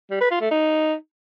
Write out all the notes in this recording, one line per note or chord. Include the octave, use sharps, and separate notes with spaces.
G3
B4
F4
A3
D#4